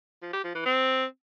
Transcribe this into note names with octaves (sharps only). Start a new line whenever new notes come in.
F3
G4
F3
E3
C4